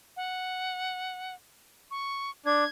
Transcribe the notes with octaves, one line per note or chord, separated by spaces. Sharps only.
F#5
C#6
D4 G#6